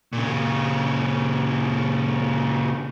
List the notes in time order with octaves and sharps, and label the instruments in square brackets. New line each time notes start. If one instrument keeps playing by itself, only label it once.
[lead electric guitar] A#2 C#3